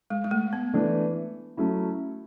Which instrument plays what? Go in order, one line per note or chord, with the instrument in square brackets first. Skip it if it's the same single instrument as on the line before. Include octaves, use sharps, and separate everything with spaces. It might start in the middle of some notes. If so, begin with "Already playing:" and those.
[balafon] G#3
G#3
A3
B3
[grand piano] E3 A3 D4
F#3 A3 C#4 E4